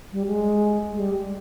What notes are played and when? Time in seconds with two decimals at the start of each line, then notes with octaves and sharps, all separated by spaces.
0.12 G3
0.27 G#3
0.92 G#3
0.99 G3